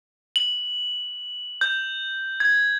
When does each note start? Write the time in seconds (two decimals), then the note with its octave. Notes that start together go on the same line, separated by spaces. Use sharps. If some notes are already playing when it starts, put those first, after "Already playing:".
0.36 F#7
1.61 G6
2.40 G#6